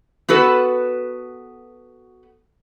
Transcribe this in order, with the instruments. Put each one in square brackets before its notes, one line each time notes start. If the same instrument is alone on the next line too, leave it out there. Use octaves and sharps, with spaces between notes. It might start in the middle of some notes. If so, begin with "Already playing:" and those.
[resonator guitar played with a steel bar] B3 F#4 A4 B4